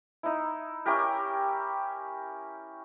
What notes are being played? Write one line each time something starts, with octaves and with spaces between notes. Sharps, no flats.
D#4 E4
C#4 E4 G4 A#4